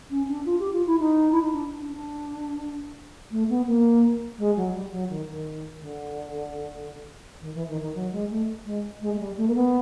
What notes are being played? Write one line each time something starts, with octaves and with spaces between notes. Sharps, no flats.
C#4
D4
F4
G4
F4
E4
D#4
E4
D#4
D4
D4
D4
A3
B3
A#3
G#3
F#3
G3
F#3
D#3
D#3
D3
D#3
E3
D#3
D#3
F#3
G#3
A3
G#3
G#3
G#3
G3
A3
A#3
B3